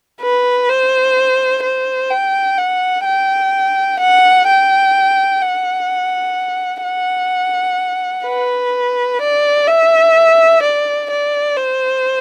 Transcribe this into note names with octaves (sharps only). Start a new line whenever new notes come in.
B4
C5
C5
G5
F#5
G5
F#5
G5
F#5
F#5
B4
D5
E5
D5
D5
C5